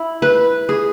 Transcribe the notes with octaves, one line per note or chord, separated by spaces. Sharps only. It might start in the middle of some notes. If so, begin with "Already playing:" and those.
Already playing: E4
B4
G#4